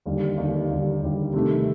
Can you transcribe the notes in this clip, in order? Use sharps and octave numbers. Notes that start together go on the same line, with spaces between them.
D#2 D3 G3
D#2 D3 G3
D#2 D3 G3
D#2 D3 G3
C3 D#3 A3